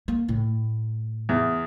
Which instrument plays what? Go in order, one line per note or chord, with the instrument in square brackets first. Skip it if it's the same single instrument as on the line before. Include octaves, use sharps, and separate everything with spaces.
[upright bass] A#3
A2
[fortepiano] E2